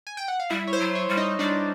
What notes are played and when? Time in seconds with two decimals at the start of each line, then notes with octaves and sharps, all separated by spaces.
0.07 G#5
0.17 G5
0.28 F#5
0.40 F5
0.50 G3 E4 E5
0.67 C#5
0.73 C5
0.80 F#3
0.95 C#5
1.09 G3
1.17 D#4 D#5
1.39 G3 D4 D5